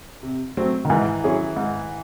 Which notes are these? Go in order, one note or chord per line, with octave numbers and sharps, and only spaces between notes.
C3
F#3 A3 C4
D#3
G#2 E3
F#3 C#4 E4 G#4
G#2